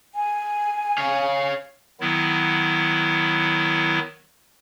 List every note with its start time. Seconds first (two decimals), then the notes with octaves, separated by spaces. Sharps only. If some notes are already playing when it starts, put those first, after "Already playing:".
0.14 G#5
0.98 C#5 F5
2.00 D#3 F#3 B3 E4